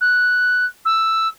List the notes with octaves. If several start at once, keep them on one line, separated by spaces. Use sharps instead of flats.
F#6
E6